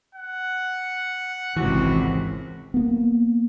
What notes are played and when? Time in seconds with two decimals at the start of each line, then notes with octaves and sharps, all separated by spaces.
0.15 F#5
1.57 G#1 C#2 C3 E3 F#4
2.74 A#3 B3